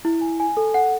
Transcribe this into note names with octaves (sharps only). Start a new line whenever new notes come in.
E4
G#5
G#5
A4
F#5